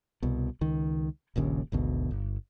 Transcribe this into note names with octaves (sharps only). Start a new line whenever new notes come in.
C2 B2
C#2 D#3
D#1 A#1 D#2 C#3
G#1 D2 B2
G1